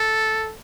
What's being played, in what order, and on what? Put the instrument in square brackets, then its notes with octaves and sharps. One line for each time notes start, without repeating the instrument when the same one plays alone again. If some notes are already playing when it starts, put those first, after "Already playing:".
Already playing: [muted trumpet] A4